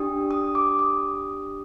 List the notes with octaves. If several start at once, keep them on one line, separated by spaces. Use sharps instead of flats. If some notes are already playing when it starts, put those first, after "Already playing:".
Already playing: D4 G4 D#6
D#6
D6
D#6